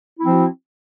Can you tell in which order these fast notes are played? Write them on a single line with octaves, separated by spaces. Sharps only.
E4 C4 F3 F#4